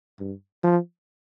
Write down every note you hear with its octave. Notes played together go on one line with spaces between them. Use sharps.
G2
F3